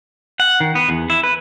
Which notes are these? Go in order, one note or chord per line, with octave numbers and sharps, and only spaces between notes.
F#5
D#3
B3
E2
E4
B4